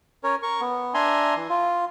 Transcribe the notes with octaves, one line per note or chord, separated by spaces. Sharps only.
C#4 A#4 C#5
A#4 C#6
B3
D4 E5 G#5 A#5 C6
E3
F4